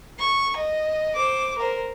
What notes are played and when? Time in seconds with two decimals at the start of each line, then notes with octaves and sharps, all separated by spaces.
0.20 C#6
0.56 D#5
1.15 C5 D6
1.58 A#4 C5